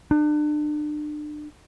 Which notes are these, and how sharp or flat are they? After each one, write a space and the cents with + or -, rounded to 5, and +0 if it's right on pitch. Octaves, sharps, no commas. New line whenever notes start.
D4 +35